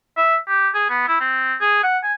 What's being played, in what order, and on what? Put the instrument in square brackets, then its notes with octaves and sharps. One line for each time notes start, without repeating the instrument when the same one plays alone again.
[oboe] E5
G4
G#4
B3
E4
C4
G#4
F#5
G#5